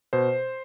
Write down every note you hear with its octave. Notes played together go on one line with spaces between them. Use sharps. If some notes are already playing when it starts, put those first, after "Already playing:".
B2 C5